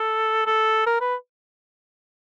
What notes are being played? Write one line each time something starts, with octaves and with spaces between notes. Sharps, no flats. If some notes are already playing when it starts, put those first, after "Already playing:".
Already playing: A4
A4
A#4
B4